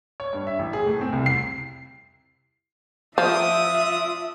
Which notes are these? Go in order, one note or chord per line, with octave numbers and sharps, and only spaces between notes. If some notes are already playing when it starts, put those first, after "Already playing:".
C#5
G2
E5
A1
G#4
A2
C4
C2
C7
F3 D4 F4 E5 D#6